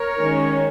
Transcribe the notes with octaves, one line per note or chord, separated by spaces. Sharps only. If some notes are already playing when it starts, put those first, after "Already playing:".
Already playing: A#4 C#5
D#3 G#3 C#4